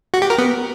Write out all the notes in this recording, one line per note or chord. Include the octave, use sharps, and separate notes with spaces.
F#4
G4
A#4
B3